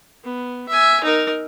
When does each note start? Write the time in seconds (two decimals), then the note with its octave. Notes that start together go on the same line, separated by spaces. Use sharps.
0.24 B3
0.68 E5 G#5
1.04 D#4 A#4